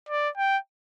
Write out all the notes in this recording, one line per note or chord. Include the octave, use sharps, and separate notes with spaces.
D5
G5